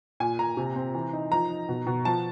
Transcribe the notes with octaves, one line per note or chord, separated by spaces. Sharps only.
A#2 G#5
A#2 A#5
C3
C4
E3
D#4
F3 A#5
D#4
B2
B2
F3 A5